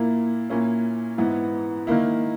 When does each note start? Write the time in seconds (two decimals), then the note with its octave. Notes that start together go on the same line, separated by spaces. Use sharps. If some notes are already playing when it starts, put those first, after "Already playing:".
Already playing: A#2 A#3 E4
0.50 A#2 A#3 C#4 E4
1.18 G#2 E3 B3 E4
1.87 D#3 A#3 E4